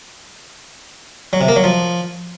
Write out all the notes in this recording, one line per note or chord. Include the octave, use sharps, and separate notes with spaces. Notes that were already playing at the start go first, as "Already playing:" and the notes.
F#3
C3
A#3
F#3
F3